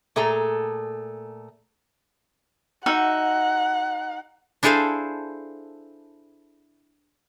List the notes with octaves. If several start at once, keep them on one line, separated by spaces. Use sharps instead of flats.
A#2 A3 G#4 A4 A#5
D#4 F#4 E5 F#5
D4 E4 G#4 A4 C5 F5